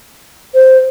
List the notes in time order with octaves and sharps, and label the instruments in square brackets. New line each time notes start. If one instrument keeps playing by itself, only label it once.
[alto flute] C5